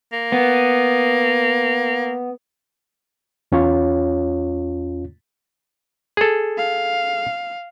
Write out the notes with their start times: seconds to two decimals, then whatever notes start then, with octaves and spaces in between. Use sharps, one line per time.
0.13 A#3
0.32 B3
3.52 E2 C#4 F4 C#5
6.17 G#4 A4
6.58 F5